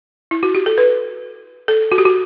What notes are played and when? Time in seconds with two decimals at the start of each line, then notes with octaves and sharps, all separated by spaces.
0.31 E4
0.43 F#4
0.55 G4
0.66 A4
0.78 B4
1.68 A4
1.92 F#4
1.98 G4
2.05 F#4